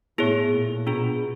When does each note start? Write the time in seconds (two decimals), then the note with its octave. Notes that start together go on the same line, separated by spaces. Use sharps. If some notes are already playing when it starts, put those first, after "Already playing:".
0.18 A2 B3 E4 G#4 C#5
0.53 A#2
0.87 B2 D4 F4 G#4